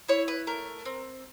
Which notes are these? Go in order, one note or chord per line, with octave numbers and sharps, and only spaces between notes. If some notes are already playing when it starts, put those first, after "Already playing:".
E4 C#5
B4
A3 A#4
C4